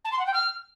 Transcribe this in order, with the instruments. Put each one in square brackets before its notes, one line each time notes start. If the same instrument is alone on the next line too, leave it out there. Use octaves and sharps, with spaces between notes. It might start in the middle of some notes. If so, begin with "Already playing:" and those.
[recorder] A5
C6
F#5
G5
F6